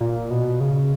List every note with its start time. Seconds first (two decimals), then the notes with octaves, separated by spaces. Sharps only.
0.01 A#2
0.31 B2
0.60 C#3